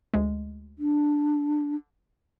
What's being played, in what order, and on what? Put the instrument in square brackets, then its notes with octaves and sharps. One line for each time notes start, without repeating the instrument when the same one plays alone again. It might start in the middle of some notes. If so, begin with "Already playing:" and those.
[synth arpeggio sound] D2 G#3
[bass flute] D4